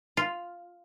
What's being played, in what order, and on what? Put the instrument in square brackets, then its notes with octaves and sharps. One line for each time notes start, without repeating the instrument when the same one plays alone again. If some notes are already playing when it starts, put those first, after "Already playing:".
[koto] F4